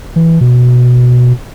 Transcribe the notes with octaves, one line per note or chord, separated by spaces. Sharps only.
E3
B2